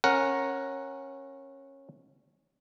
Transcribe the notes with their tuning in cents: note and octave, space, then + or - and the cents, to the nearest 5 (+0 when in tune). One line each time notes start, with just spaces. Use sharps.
C#4 -20 A#4 +5 F#5 +0